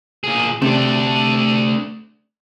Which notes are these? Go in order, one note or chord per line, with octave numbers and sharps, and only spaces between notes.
A#2 G#4
C3 A3 D4